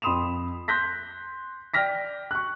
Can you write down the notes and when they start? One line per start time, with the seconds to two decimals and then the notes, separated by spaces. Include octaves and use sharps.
0.02 F2 B5 C6 D#6 E7 F7
0.68 C6 F#6 G6 A#6 B6
1.74 D5 G5 F6 A#6 B6
2.31 C#6 F#6